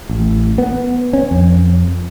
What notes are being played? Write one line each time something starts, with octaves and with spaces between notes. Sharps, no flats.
A1
B3
C#4
F2